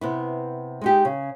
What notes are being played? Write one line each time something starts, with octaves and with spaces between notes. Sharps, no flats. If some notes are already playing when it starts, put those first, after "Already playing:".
C3 B3 E4
G#3 D#4 G4
C#3